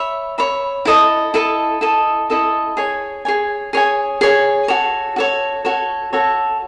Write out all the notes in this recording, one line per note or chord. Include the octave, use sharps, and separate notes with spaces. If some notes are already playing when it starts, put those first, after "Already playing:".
Already playing: C#5 E5 B5
C#5 E5 B5
E4 A4 D#5 A5
E4 A4 D#5 A5
E4 A4 D#5 A5
E4 A4 D#5 A5
G#4 C#5 G#5
G#4 C#5 G#5
G#4 C#5 G#5
G#4 C#5 G#5
F#4 A4 C#5
F#4 A4 C#5
F#4 A4 C#5
F#4 A4 C#5